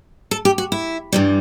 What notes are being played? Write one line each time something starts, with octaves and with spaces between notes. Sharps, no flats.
A4
G4
F#4
E4
G2 E3 G3